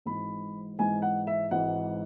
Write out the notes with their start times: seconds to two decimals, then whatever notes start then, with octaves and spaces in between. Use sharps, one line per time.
0.06 G#1 G#2 E3 B5
0.78 G#1 G#2 E3 G#5
1.02 F#5
1.27 E5
1.51 G#1 G#2 E3 F#5